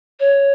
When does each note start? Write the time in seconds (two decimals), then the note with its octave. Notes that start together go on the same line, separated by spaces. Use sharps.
0.20 C#5